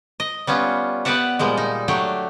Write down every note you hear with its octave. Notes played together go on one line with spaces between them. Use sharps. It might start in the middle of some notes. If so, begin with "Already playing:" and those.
D#5
G3 B3 C#4 F4
B3 G4 B4 D5 E5 F#5
A#2 F3 G3 G#3
D#4
F#3 A3 D4 G4